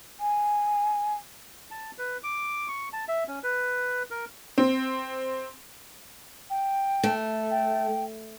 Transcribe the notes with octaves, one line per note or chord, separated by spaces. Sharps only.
G#5
A5
B4
D6
C#6
A5
E5
C#4
B4
A#4
C4
G5
A3
G5